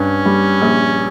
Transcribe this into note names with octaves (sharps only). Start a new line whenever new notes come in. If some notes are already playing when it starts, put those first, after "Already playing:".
Already playing: G2 C#4
G3
A#1